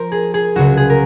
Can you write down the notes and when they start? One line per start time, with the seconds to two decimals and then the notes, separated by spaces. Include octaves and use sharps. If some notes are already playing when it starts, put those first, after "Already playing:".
Already playing: F3 A#4 C5
0.12 G#4
0.34 G#4
0.56 C#2 C#3 F#3 F#4
0.77 G#4
0.90 A#4